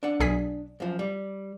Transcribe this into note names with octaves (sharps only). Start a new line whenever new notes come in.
D4 F#5
B1 G#4 B6
F#2 F3
G3